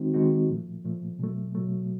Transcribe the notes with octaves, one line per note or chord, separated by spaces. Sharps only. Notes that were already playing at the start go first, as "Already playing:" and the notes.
Already playing: D#3 G#3 C4 D#4 F#4
D#3 G#3 C4 D#4 F#4
A#2 F3 A3
A#2 F3 A3
B2 F#3 A3
B2 F#3 A3